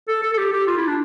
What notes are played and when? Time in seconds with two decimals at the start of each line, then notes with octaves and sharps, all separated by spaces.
0.08 A4
0.23 A4
0.34 A4
0.38 G4
0.52 G4
0.67 F4
0.77 E4
0.87 D4